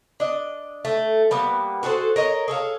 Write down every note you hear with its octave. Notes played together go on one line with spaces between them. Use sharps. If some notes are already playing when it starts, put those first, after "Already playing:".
D4 D#5
A3
G3 A#3 B3
F#4 G#4 A4 C5
A#4 C#5 D#5
G#4 A4 C#5 F5